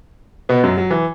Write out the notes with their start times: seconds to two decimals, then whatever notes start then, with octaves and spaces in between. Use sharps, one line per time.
0.49 B2 B3
0.64 F#2 F#3
0.78 F#3
0.91 E3